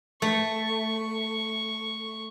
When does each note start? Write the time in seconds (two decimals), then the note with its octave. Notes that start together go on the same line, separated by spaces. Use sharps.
0.22 A3 C#6